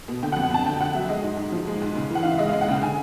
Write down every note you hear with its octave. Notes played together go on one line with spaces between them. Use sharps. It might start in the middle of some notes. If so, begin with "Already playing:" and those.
B2
D3 G5
F#5
F2
F#5
F2 A5
D3 G5
D3 F#5
F#3 E5
G#3 D#5
G#2
G#2
F3
G#3
G#2
C#3
E3 F#5
E3 F5
E5
G#3 D#5
G#3 F5
F#5
C#3 G5
D3 G#5